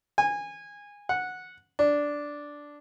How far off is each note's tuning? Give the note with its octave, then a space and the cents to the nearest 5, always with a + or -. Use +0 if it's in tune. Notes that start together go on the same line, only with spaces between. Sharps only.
G#5 -20
F#5 -10
D4 -5